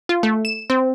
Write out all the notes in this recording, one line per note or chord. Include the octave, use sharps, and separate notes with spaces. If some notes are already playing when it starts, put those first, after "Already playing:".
F4
A3
E7
C4